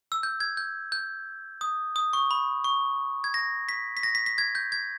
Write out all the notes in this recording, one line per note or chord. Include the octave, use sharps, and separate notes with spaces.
E6
G6
G#6
G6
G6
D#6
D#6
C#6
B5
C#6
G#6
A#6
B6
B6
A#6
B6
B6
G#6
G6
G#6